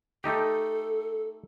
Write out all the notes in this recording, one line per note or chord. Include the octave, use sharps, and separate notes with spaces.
A3 D#4 G4 A4